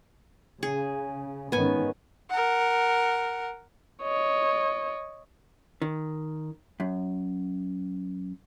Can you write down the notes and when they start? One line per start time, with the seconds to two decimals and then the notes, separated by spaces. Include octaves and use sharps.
0.63 C#3 G#4
1.52 G#2 D#3 B3 C#4 G#5
2.30 A#4 F#5
4.03 C#5 D#5
5.82 D#3
6.80 F#2